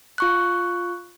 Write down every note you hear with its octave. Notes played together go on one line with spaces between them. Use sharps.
F4 C#6 F#6